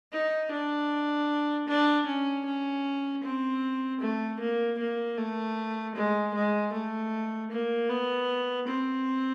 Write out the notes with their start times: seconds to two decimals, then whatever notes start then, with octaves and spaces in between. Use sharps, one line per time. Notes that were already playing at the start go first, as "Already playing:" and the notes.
0.12 D#4
0.51 D4
1.68 D4
2.06 C#4
2.45 C#4
3.23 C4
4.01 A3
4.40 A#3
4.79 A#3
5.17 A3
5.95 G#3
6.34 G#3
6.73 A3
7.51 A#3
7.89 B3
8.67 C4